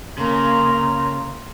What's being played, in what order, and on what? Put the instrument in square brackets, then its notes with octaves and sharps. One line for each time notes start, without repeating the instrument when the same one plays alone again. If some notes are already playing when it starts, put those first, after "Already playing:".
[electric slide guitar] C#3 [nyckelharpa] A#3 A#5 [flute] C6